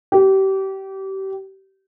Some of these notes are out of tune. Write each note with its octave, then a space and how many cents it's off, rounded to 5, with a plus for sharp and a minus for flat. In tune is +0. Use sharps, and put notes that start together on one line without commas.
G4 -30